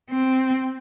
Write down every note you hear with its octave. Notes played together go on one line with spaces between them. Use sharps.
C4